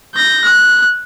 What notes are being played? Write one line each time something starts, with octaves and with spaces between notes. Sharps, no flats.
G6 A#6
F#6